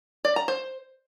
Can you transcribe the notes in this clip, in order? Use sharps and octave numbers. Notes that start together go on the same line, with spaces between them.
D5
A#5
C5